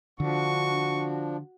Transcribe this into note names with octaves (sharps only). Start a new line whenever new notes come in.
D3 F3 D4 F#4 C#6